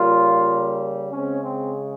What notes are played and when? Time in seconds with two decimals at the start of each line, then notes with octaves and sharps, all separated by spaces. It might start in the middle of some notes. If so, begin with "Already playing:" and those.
Already playing: C#3 G3 A#3 F4
1.11 C#3 G#3 C4 C#4
1.43 C4